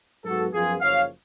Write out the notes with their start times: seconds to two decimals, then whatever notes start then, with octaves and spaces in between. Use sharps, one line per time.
0.25 G#2 F#3 B3 F#4 A4
0.53 F#2 F3 B3 F4 G#4
0.81 F#1 F#2 F3 C#5 F5